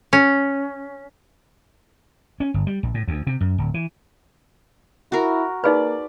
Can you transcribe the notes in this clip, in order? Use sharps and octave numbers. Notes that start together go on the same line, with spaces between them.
C#4
C#4
G1
G3
A#1
A2
D2
C3
F#2
D1
E3
E4 F#4 A#4
A#3 D#4 G#4 B4 D5 B5